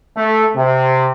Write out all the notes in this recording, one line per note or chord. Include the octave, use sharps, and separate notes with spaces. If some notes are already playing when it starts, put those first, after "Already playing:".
A3
C3